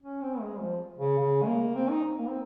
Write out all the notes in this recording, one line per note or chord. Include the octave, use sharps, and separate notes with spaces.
C#4
C4
G#3
F3
C#3
C#3
G#3
A#3
C4
D#4
A#3
C4